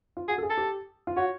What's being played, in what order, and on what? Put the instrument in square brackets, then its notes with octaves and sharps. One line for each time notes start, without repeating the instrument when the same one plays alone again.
[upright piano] F4
[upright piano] F#4 [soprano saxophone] G#4
[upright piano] A4
G#4
[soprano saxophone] A4
[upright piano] G4
F4
[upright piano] F#4 [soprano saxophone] C#5